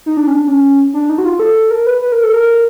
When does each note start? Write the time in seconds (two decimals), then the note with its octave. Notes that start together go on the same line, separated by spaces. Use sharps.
0.06 D#4
0.17 D4
0.27 C#4
0.33 D4
0.48 C#4
0.94 D4
1.09 D#4
1.18 F#4
1.25 F4
1.39 A4
1.71 A#4
1.86 B4
2.02 B4
2.12 A#4
2.23 A4
2.34 A#4